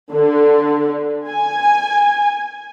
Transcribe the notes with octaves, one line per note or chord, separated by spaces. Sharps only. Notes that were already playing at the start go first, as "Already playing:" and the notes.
D3
G#5